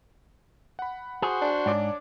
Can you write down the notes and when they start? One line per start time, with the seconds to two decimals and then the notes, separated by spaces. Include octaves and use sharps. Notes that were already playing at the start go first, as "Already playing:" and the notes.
0.79 F#5 B5
1.22 F#4 G#4 C5
1.42 D4
1.66 G#2 C#5 D5 D6